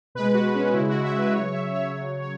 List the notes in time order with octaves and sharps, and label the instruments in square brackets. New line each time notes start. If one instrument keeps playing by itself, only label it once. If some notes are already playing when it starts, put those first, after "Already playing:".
[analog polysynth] B2 G#3 B4
F#4
C#4
C#3 G#3 E4
F#4
E5
B4
C#3 F#3 C#5
E5
C#5
C#3 F#3 C#5
C#5